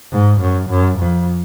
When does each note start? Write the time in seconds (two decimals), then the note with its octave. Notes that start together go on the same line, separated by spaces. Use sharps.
0.12 G#2
0.41 F#2
0.70 F#2
0.99 F2